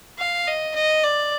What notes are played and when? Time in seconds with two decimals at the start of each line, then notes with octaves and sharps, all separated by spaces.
0.19 F5
0.48 D#5
0.76 D#5
1.04 D5